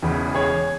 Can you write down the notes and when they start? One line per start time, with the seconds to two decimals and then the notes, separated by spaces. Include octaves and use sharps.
0.02 E1 E2 C#3 E3
0.35 G#4 C#5